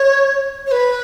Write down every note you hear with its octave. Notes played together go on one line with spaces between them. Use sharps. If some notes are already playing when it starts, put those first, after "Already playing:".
Already playing: C#5
C#5
B4